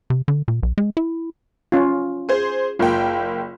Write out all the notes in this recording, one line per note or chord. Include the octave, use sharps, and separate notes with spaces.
C3
D3
A#2
B1
G#3
E4
C#4 F4
G#4 C5
F#1 A#3 F4 G5